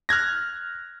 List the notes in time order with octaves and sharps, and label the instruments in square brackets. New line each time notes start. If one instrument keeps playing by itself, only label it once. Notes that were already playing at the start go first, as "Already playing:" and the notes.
[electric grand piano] F6 F#6 G#6 A#6